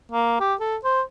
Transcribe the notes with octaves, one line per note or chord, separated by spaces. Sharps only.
A#3
G4
A4
C5